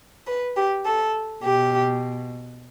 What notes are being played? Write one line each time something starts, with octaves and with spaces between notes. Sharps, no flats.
B4
G4
A4
B2 G4